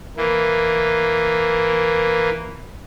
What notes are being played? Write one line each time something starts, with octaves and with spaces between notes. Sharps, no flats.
E3 A#3